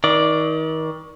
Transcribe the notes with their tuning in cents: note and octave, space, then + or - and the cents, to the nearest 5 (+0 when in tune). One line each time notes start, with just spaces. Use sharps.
D#3 +35 D5 +0